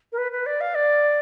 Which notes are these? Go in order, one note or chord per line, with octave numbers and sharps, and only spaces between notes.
A#4
B4
B4
D5
F5
D5